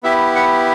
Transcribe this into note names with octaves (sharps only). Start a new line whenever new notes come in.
B3 E4 G4 E5
F#5